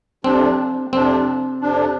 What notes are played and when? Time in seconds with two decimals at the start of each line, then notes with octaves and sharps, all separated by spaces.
0.24 F2 C3 F3 C4 D4
0.93 F2 C3 F3 C4 D4
1.61 F2 C3 F3 D4